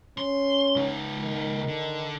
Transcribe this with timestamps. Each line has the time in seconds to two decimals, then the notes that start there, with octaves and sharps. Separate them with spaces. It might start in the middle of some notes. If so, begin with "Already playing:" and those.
0.18 C#4 C6
0.76 C#2 D#4
1.22 D#3
1.67 D3